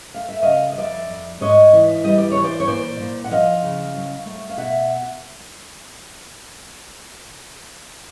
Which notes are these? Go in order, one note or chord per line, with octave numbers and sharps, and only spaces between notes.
A3 F5
E5
C#3 D#5 F5
D#5
F2 D5 E5
F2
G#2 C#5 D#5
E3
G3 D#5
D5
C#5
E3
C5 D5
C#5
A#2 C5 D5
A#2
F#5
F3 D#5 F5
C#3
F#3
A3
F5
B2 E5 F#5